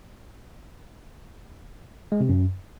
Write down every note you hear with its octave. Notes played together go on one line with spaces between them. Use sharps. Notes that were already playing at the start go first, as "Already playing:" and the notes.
G#3
C3
F#2